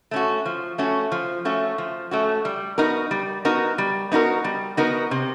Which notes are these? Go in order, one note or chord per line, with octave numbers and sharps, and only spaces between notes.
A3 C#4 F#4
F3
A3 C#4 F#4
F3
A3 C#4 F#4
F3
A3 C#4 F#4
G3
B3 D#4 F#4 A#4
G3
B3 D#4 F#4 A#4
G3
B3 D#4 F#4 A#4
G3
B3 D#4 F#4 A#4
C3